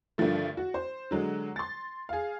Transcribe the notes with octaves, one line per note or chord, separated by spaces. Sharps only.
G2 D3 D#3 F3 A3
F#4
C5
D3 F#3 G#3
C6 A6
G#4 F5